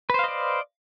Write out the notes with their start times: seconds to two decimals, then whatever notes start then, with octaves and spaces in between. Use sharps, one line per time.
0.10 B4
0.14 C5
0.19 F5
0.24 D#5
0.28 D5